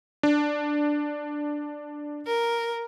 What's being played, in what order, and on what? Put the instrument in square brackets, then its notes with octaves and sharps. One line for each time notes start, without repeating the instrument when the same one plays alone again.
[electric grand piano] D4
[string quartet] A#4